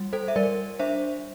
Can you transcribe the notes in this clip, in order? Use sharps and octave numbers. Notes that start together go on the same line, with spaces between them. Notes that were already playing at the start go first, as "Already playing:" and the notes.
Already playing: G3
A4 C5
E5
G3 A#4 D5
D4 C5 E5